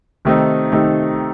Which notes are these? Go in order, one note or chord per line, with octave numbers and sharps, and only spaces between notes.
C3 D#3 A3 C4 D#4
C3 D#3 A3 C4 D#4